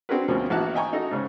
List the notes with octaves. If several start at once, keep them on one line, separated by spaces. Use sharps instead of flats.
C4 D4 F#4 G#4 A#4 B4
D2 B2 F3 A#3 C4 C#4
A#1 E3 F#4 A5 F#6
D#5 E5 G5 G#5 A#5 C#6
D#4 F#4 A4 D#5
G#2 C#3 C#4